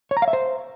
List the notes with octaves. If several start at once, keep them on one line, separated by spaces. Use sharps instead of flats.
C#5
A#5
F5
E5
C5